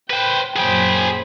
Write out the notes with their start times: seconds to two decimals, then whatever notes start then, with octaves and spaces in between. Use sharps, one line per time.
0.10 B4 C5 G5
0.56 F#2 A#2 F#3 G#4 C5 G5 B5